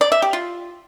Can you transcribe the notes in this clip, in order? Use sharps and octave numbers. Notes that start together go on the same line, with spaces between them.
D5
E5
G4
F4